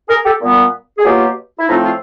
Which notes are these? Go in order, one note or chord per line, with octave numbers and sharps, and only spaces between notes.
G#4 A#4
G4 A4
A#2 G3 B3
G#4
B2 F#3 A#3 F4 G4
E4
A2 F3 A3 C4 D#4 F4
F4